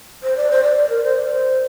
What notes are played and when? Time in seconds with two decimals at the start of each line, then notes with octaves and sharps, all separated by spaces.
0.23 C5
0.37 D5
0.51 C5
0.63 D5
0.77 D5
0.89 A#4
1.03 C5
1.17 D5
1.30 C5